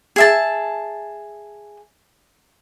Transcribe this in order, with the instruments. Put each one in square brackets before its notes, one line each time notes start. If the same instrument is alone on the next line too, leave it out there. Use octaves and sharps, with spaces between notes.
[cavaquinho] G#4 E5 A5